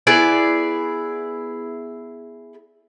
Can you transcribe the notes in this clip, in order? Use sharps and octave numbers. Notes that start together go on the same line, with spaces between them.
B3 E4 G#4 D5